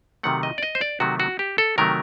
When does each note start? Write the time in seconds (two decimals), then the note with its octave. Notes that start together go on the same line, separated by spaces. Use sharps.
0.23 C3 D#3 F#3 A3 F#5
0.43 D#5
0.58 D5
0.63 D#5
0.75 C5
0.81 D5
1.00 C3 D#3 F#3 A3 F#4
1.20 F#4
1.39 G4
1.58 A4
1.78 C3 D#3 F#3 A3 A#4